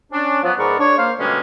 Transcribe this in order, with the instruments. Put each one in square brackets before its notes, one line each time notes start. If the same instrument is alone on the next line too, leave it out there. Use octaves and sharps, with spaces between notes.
[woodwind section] C#4 D4
F3 F#3 B3
G#2 G#3 B3 A#4 D5 C#6
D4 C#5
A#3 C5 F5
B2 D3 G3 G#3 A#3 C#4